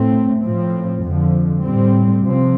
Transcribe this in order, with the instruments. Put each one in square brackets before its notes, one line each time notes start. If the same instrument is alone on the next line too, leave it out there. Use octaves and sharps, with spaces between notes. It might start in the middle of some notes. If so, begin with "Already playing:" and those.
Already playing: [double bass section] A2 A3 C4
A2 F3 C4
F2 D3 F3
A2 G3 C4
C3 F3 C4